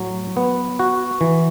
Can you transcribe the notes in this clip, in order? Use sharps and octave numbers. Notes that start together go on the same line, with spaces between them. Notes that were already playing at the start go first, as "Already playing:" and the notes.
Already playing: A2 F#3
B3
F#4
E3